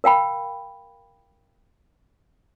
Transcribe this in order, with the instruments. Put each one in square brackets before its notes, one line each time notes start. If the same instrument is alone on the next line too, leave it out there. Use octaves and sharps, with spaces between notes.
[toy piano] A#4 F5 G5 B5